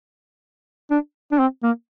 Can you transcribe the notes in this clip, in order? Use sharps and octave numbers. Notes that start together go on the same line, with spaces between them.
D4
D4
C4
A#3